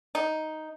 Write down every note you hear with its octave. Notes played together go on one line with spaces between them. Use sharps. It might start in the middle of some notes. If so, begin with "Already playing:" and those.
D#4